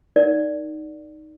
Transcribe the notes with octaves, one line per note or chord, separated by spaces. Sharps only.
D#4 A#4 D5 F#5